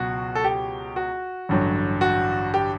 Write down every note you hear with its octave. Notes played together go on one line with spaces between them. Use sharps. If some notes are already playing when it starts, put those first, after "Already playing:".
Already playing: C#2 B2 F#3 F#4
A4
G4
F#4
A1 G2 D3 F#3
F#4
G4